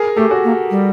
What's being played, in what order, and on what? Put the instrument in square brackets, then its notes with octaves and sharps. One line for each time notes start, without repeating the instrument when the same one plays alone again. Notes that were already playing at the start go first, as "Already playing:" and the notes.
Already playing: [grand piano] G#4 A#4
[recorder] A3 [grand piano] G4 A4
[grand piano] F#4 G#4
[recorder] A#3
G3